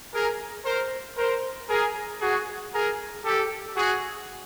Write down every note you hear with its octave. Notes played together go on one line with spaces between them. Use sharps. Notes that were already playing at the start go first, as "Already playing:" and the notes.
G#4 A#4
A#4 C5
A#4 C5
G#4 A#4
F#4 G#4
G#4 A#4
G4 A4
F#4 G#4